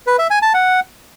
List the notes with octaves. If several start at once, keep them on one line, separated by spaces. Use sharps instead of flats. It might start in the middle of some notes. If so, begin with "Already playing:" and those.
B4
E5
G#5
A5
F#5